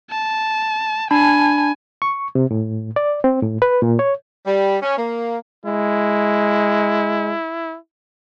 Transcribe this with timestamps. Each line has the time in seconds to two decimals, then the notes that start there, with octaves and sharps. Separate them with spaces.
0.10 A5
1.11 D4 G#5 A5 B5
2.02 C#6
2.35 C3
2.51 A2
2.96 D5
3.24 C4
3.43 A2
3.62 B4
3.82 A#2
3.99 C#5
4.45 G3
4.82 C#4
4.97 A#3
5.66 G#3 E4